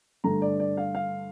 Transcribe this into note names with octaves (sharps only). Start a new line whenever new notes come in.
G2 D3 A3 A#5
D5
D5
F5
F5